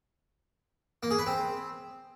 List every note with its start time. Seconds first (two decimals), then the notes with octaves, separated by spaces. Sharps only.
1.03 A#3
1.11 G#4
1.19 B4
1.26 C4